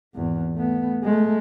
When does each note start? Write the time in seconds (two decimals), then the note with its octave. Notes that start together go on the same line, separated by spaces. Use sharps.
0.15 G#1 E2
0.55 A3 B3
1.03 G#3 A3